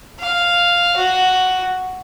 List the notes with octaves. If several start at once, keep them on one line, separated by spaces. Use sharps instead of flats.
F5
F#4